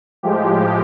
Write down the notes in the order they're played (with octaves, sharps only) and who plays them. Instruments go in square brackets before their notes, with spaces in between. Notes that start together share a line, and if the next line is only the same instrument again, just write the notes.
[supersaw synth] A2 F3 G#3 G4